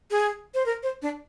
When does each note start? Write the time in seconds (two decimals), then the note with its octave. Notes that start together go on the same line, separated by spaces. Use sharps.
0.11 G#4
0.54 C5
0.66 A#4
0.83 C5
1.02 D4